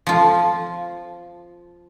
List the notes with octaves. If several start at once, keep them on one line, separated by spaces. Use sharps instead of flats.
F3 F4